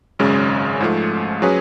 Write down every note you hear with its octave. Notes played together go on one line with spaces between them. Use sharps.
G#1 F#2 C#3 G#3 C#4
G#2 F3 A3
F#3 C#4 G#4 B4